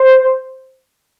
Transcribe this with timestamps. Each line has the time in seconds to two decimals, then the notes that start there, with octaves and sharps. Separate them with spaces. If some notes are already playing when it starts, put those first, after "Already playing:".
Already playing: C5